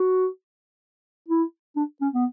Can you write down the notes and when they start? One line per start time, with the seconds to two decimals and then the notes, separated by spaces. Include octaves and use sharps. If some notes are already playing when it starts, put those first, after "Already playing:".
Already playing: F#4
1.29 E4
1.76 D4
2.01 C#4
2.14 B3